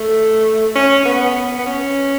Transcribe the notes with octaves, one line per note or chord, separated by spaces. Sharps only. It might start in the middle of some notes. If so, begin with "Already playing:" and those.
Already playing: A3
C#4
B3
B3
B3
C#4